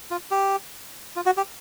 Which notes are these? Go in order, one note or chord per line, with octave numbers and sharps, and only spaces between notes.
F4
G4
F4
F#4
G4